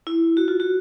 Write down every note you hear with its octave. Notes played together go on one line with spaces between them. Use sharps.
E4
F#4
F4
F#4